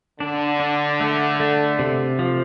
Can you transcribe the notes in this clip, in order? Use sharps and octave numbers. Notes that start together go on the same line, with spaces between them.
D3 D4
D4
A3
A3
C3
F3